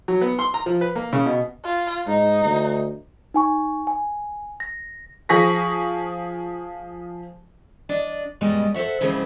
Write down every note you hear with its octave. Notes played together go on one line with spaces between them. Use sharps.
F#3
B3
C6
A#5
F3
B4
A#3
C#3
B2
F4
G#2 D#4
D2
D#4 G#5 C#6
G#5
A#6
F3 G#4 C#6 A#6 B6
D4 D5 D#5
G2 B2 G3 G#3 D#5
A4 C5 C#5 E5 F#5
C#3 F3 G#3 A#3 C4 E4